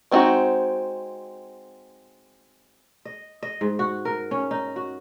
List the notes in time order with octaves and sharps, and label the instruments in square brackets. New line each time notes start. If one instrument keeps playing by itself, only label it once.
[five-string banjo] G#3 C4 D4 D#4 F#4
[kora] D#5
D#5
G#2
F#4
A#4
C#4
D#4
F#4